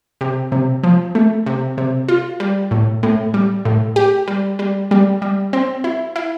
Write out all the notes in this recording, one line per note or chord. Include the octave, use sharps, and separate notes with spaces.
C3
C3
F3
A3
C3
C3
F4
G3
A2
A2
G3
A2
G4
G3
G3
G3
G3
C4
E4
E4